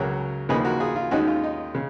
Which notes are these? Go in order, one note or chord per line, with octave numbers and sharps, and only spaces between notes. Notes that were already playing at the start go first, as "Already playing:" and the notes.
Already playing: C#2 C#3 F#3 A#4 C#5
D#2 C#3 F3 A#3 D#4 G#4 B4
F#4 A#4
F4 G#4
F4
D#2 D#3 G#3 C#4 D#4 F#4
F4
D#4
C#3